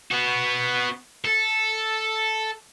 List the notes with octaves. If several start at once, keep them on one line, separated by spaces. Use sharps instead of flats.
B3 F#4
A4